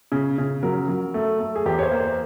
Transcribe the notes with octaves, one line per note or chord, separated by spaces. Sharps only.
C#3
C#3
F#3 A#4
F#3
A3
A3
G#4
E2 G4
C#5
C5
A#3
C5